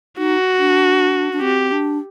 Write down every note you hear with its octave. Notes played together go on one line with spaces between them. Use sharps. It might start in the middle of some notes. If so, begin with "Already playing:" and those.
D#4 F#4
D4
D4
C4 G4
D4